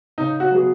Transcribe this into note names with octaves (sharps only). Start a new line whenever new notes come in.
C#3 D#4
F#4
F#3 B3 G#4